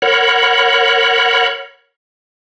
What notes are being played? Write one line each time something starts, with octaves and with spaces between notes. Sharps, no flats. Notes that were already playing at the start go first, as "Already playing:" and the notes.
A#4 C#5 F#5 B5